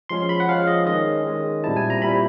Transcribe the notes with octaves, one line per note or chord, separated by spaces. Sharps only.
F3 G#3 C#4 C6
B5
F#5
F3 G#3 C#4 F5
D#5
D#3 G#3 C#4 D#5
D#3 G#3 C#4
A#2 G3 C4 E4 A5
G#5
A#5
A#2 G3 C4 E4 B5